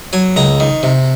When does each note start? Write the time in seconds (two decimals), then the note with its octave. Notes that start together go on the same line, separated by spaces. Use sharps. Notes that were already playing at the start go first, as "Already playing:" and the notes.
0.13 F#3 G#5
0.36 C#2 A#5
0.60 D#3
0.83 C3